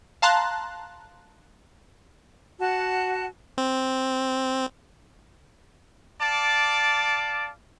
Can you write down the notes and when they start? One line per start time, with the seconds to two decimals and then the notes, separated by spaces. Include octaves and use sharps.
0.22 F5 A5 A#5 C6 F#6
2.60 F#4 F#5 A5
3.58 C4
6.20 D5 F5 A5 D6